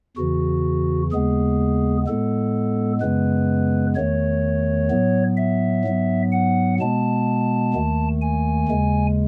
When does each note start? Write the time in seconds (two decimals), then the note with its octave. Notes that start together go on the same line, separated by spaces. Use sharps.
0.17 E2 C#3 E3 F#4
1.12 D#2 C#3 G#3 B3 G#4
2.06 A2 G#3 B3 A4
3.01 F#2 C#3 G#3 B3 B4
3.96 E2 D#3 A3 C#5
4.90 A2 F#3 B3
5.37 E5
5.85 G#2 F#3 B3
6.32 F#5
6.80 B2 G#3 B3 A5
7.74 D#2 D#3 A3
8.22 G#5
8.69 D#2 C#3 G#3